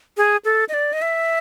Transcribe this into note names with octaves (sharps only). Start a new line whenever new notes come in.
G#4
A4
D#5
D5
D#5
E5